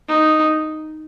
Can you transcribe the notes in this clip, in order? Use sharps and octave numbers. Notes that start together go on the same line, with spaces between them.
D#4